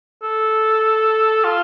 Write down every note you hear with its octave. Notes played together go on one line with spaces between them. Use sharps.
A4
F4